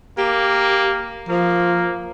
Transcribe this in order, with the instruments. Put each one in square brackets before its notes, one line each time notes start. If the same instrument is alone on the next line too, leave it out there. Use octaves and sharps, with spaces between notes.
[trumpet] A#3 [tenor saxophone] G4
[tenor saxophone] F3 [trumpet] A#3